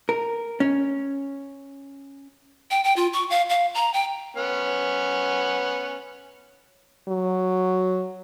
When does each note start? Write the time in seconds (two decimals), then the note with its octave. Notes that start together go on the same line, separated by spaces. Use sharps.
0.09 A#4
0.60 C#4
2.71 G5
2.84 G5
2.96 F4
3.13 C#6
3.30 F5
3.49 F5
3.75 A#5
3.94 G5
4.37 B3 C#4 F#5
7.08 F#3